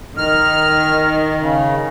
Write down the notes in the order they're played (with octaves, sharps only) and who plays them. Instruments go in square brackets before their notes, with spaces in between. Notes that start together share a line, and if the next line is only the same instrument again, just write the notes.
[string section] D#3 [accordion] F6
[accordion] C#3